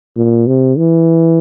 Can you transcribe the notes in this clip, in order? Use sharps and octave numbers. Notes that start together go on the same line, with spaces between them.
A#2
C3
E3